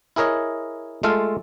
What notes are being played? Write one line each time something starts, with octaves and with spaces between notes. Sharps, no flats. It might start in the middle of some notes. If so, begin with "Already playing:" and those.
E4 G#4 A#4 C#5 D#5
G#3 A3 F4 A4 F5